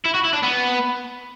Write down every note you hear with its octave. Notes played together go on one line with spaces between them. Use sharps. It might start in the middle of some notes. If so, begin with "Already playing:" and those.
E4
F#4
E4
D4
B3